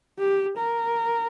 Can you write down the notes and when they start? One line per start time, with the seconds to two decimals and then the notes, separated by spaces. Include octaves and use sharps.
0.19 G4
0.57 A#4